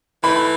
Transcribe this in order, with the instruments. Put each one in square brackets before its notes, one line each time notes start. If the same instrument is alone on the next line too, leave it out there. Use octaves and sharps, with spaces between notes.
[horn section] E3 A3 [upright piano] B5
[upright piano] B5